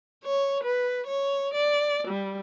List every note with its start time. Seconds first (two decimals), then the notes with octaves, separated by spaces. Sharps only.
0.24 C#5
0.63 B4
1.07 C#5
1.53 D5
2.07 G3